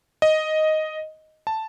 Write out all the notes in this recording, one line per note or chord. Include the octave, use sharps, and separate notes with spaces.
D#5
A5